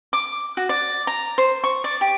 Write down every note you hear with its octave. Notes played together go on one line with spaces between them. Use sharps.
D6
F#4
D5
A#5
C5
C#6
D5
G4